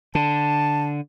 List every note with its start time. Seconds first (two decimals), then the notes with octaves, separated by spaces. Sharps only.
0.15 D3 A5